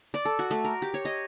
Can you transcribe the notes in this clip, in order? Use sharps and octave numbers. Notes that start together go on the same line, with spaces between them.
D5
A4
F#4
A3
A#4
G4
C#5
D#5